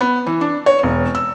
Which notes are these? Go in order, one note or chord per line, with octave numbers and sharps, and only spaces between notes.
B3
E3
D4
C#5
E1
E6